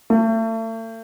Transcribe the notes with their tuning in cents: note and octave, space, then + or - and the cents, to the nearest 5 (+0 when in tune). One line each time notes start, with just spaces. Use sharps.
A3 +40